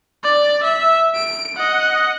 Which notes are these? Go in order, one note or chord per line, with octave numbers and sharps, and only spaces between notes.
D5
E5
D7
D#5 F#5